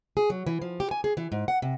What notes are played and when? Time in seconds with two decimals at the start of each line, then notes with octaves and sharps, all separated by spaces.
0.17 G#4
0.30 F#3
0.47 E3
0.62 F3
0.80 G4
0.91 G#5
1.04 G#4
1.17 E3
1.32 G#2
1.48 F#5
1.62 C3